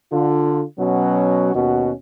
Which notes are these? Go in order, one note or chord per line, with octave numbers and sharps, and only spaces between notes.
D3 F4
B2 F#3 C#4 F#4
D#2 B2 C#4 F#4